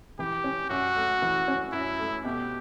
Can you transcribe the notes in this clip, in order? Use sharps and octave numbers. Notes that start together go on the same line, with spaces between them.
E3 G4
C#4
F#2 F#4
A3
E3
C#4
F#2 E4
A3
B2 G4